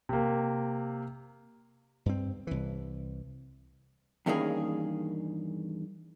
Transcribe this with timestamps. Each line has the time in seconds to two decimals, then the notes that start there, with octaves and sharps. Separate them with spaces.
0.09 C3 A#3
2.06 G2 C4
2.47 C2 E3
4.26 E2 G2 D#3 A#3 C#4 G#4